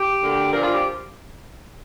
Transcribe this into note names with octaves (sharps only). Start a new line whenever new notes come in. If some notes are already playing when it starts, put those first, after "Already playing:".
Already playing: G4
D2 D3 A#3
A#2 F3 A#3 D4 A#4
F4
G4